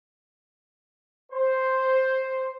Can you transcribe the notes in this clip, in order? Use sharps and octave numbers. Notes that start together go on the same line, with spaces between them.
C5